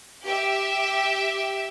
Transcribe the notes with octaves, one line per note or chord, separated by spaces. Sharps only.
G4 E5